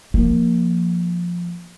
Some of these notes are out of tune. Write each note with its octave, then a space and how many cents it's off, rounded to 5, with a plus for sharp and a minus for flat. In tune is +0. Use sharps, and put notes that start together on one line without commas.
F3 +0 A#3 +0